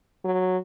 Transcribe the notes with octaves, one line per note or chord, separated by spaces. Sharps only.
F#3